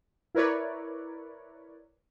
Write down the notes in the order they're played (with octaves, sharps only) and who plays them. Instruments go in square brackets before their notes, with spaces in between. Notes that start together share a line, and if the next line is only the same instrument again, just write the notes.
[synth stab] E4 A#4 B4 C#5 D5